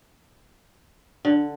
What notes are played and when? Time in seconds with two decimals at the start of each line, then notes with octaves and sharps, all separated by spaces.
1.25 D3